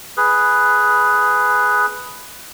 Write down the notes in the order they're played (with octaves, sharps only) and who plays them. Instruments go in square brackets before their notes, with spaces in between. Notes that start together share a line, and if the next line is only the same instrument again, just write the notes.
[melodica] G#4 B4